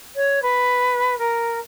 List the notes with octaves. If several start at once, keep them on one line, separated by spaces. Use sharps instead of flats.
C#5
B4
A#4